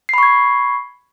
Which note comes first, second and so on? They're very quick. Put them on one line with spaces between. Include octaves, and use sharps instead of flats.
C7 B5 C#6 G#6